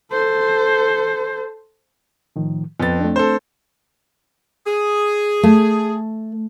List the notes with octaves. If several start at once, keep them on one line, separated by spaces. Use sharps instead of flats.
A4 C5
A2 D#3 F3
F2 B3 B4 A6
A3 C4 D4
A4 C5
G#4
A3